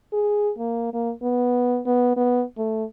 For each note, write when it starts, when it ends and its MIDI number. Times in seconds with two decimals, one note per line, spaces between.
0.13 0.51 68
0.59 0.91 58
0.94 1.11 58
1.23 1.80 59
1.86 2.13 59
2.17 2.43 59
2.58 2.84 57